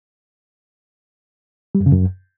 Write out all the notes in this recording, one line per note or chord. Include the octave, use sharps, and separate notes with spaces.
G3
F#2
C#3
F#2